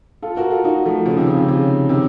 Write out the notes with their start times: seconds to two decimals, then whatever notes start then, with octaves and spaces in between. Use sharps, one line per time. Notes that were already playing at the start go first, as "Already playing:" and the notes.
0.22 F4 A4
0.37 F#4 A#4
0.51 F4 A4
0.64 D#4 F#4
0.86 F3 A3
1.06 C#3 F3
1.17 C3 D#3
1.27 C#3
1.37 C3
1.48 C#3
1.89 C3 D#3